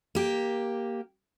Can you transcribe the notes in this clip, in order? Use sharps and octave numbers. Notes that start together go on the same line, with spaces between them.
A#3 G4